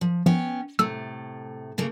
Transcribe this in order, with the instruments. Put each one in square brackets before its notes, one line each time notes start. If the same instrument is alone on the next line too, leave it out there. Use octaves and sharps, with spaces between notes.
[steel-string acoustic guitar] F3
[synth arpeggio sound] F3 [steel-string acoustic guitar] B3 C#4 G5
[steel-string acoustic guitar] A2 C3 A3 [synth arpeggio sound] E6
[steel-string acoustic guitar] C#3 A3 A#3